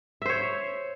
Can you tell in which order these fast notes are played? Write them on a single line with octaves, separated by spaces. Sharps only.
E5 C5 C#5